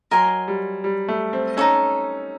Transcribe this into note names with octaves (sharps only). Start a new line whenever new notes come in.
F#3 A#4 D#5 G#5 C6
G3
G3
A3
C4
C#4 D#4 F#4 A4